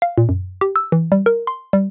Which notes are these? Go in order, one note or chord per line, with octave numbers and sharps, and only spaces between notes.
F5
A#2
F#2
G4
E6
E3
G3
A#4
C6
G3